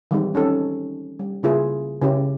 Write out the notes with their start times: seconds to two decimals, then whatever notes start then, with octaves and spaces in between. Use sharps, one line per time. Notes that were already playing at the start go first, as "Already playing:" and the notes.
0.11 D#3 E3 G3 G#3 C4 D#4
0.34 C4 C#4 D#4 A4
1.19 G3
1.43 C#3 A#3 E4 F4 G#4 B4
2.02 C#3 C#4 E4 G4